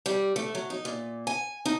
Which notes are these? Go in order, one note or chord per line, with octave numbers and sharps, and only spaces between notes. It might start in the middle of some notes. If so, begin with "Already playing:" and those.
G3
A3
F#3
D#4
A#2
G#5
D#4